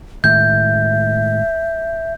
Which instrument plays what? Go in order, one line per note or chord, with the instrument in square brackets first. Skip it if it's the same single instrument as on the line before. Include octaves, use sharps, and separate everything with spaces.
[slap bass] A2 D#3 G#3 [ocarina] E5 [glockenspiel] G6